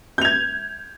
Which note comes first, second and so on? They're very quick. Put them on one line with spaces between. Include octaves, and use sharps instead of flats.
G6 F7 G#6